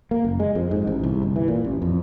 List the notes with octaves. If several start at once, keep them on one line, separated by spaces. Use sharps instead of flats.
A#3
F#1
G#3
F2
G#2
A1
C2
G1
E3
A#2
A1
F2